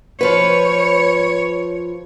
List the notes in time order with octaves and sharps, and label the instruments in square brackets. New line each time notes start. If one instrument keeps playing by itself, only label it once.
[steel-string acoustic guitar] F3 B4 [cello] C#5